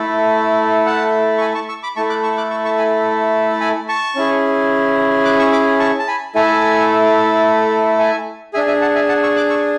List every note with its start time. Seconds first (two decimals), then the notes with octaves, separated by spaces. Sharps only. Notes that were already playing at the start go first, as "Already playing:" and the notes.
Already playing: A3 E4 A4
0.86 F#5 A5
1.38 C#6
1.41 G#5 B5
1.55 A5 C#6
1.68 C#6 E6
1.83 B5 D6
1.96 A3 E4 A4 A5 C#6
2.09 D6 F#6
2.23 C#6 E6
2.37 D6 F#6
2.51 C#6 E6
2.64 A5 C#6
2.78 G#5 B5
3.61 G#5 B5
3.89 A5 C#6
4.15 C#4 E4 G#4
5.25 D6 F#6
5.39 C#6 E6
5.52 B5 D6
5.79 A5 C#6
5.99 A5
6.08 G#5 B5
6.35 A3 E4 A4 E5 G#5
7.99 E5 G#5
8.54 D4 G#4 E5 G#5
8.67 E5 G#5
8.81 F#5 A5
8.95 E5 G#5
9.08 F#5 A5
9.23 C#6 E6
9.36 D6 F#6
9.50 C#6 E6